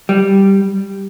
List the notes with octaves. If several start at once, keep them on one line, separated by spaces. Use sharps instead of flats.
G3